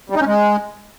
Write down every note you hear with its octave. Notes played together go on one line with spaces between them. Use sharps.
G3
D#4
C#4
G#3